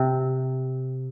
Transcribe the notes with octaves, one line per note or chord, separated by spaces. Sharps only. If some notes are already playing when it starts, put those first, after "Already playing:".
Already playing: C3